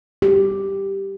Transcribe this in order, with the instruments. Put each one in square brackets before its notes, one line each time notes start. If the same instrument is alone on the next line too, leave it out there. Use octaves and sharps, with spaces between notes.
[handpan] G4